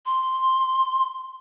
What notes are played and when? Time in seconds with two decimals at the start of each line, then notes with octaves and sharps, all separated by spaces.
0.06 C6